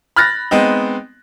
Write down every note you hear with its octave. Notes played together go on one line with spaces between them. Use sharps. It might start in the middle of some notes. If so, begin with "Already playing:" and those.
B5 F6 F#6 A6 A#6
G#3 B3 C4 D#4